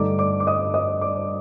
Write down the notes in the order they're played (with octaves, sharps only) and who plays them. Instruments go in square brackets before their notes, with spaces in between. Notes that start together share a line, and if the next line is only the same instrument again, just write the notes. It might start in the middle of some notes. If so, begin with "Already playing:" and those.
Already playing: [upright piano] G2 D3 A3 D#4 D5 D6
D5 D6
D6
D#5 D#6
D#5 D#6
D5 D6